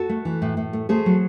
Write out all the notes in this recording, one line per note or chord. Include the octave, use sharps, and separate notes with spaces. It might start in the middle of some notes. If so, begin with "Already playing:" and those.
Already playing: F#4 A4
A3
E3
A2
A2
A3
A3 G#4 C5
F#3